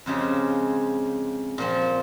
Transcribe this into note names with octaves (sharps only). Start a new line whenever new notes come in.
F2 C#3 G#3 C4 G4
A#2 F3 C4